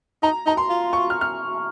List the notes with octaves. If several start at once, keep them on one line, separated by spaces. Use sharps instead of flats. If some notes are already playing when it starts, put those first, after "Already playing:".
D#4 A#5
D#4 A#5
C6
F4
C#6
F6
F6